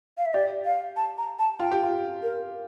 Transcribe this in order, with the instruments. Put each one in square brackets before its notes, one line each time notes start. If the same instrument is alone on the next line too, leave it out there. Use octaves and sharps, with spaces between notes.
[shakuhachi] F5
E5
[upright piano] G4 [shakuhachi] D5
[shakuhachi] F5
A5
A#5
A5
[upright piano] F4 [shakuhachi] G5
[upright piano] G4
F4
[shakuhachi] A#4